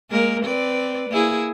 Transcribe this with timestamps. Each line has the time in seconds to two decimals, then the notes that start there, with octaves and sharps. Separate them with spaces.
0.10 G#3 A#3 A#4
0.44 C4 B4 D5
1.10 A#3 E4 G#4